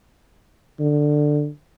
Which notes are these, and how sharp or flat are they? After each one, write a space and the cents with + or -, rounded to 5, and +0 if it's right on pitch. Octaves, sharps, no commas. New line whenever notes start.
D3 +10